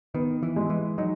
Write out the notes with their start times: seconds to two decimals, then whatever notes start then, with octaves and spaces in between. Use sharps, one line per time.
0.15 D#3 B3
0.43 E3
0.56 G#3
0.69 E3
0.98 F#3 D#4